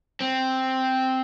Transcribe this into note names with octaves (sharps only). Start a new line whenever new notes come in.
C4